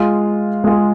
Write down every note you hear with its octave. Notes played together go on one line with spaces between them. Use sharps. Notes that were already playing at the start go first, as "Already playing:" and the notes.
Already playing: G#3 F4 G#4
G#3 F4 G#4